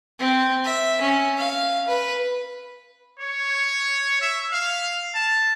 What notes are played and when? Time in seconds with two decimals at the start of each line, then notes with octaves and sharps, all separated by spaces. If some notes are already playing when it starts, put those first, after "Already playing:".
0.19 C4
0.64 E5
1.01 C#4
1.37 F5
1.88 B4
3.20 C#5
4.21 E5
4.50 F5
5.14 A5